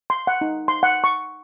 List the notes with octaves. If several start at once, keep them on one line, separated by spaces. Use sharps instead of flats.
C6
F#5
D#4
C6
F#5
C#6